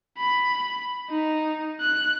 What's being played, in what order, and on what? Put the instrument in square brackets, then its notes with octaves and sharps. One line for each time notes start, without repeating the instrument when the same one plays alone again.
[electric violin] B5
D#4
F#6